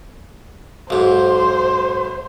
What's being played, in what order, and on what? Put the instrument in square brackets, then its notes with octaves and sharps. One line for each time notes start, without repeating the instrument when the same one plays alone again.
[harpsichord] B1 G#2 [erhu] C5